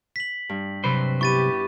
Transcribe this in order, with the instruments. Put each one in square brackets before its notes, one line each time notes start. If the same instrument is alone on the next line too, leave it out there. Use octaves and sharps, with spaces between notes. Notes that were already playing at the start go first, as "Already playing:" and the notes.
[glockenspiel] B6 F#7
[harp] G2
[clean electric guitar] C3 F#3 C5 [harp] B4
[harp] B3 E4 [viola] G4 [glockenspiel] C#6 A6 D#7